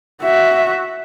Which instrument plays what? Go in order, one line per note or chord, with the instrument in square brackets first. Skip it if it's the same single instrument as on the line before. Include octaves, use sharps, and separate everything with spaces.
[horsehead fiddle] F#4 E5